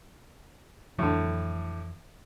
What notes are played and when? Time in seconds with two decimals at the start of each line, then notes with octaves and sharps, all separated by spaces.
0.99 F2 A2 D3 E3 F#3